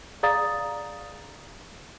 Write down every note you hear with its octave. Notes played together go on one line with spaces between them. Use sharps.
G#4 D5 F5 A#5 D#6 A6